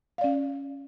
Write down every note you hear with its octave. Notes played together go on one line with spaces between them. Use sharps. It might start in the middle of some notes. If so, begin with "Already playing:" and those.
C#4 D5 F5